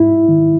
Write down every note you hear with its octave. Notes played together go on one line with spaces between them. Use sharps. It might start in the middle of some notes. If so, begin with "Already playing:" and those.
Already playing: G#2 E4
D#3